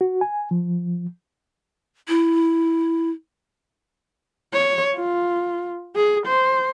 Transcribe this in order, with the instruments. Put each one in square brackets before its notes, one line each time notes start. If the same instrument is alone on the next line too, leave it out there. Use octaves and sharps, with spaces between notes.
[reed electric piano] F#4
G#5
F3
[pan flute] E4
[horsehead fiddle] C#5
F4
G#4
C5